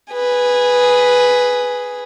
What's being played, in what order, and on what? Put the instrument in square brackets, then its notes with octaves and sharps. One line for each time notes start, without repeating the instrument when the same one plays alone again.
[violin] G#4 B4